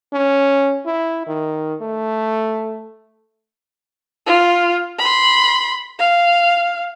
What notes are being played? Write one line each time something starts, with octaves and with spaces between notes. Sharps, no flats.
C#4
E4
D#3
A3
F4
B5 C6
F5